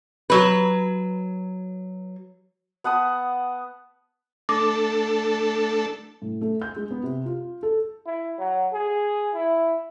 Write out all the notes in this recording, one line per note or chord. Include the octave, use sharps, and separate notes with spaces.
F#3 B4
B3 F#5 A5 D#6
A3 D4 A4 D6
A2
A3
G6
G#3
B3
C3
F4
A4
E4
F#3
G#4
E4